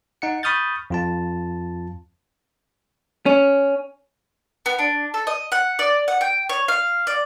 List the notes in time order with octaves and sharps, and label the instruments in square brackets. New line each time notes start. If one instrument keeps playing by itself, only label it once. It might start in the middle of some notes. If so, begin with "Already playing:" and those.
[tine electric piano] D#4 F#5 C#7
B5 C#6 D#6 F6 G6 A6
F2 F4 A5
[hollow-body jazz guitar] C#4
[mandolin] B3
D4
A4
D#5
F#5
D5
F#5
G5
C#5
F5
D5